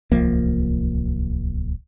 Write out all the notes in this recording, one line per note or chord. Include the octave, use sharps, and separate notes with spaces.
D1 C2 F3 A#3